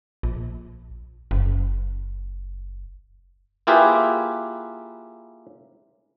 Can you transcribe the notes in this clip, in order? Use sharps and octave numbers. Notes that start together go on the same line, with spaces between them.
A#1
F#1
A#3 E4 F4 G4 G#4 B4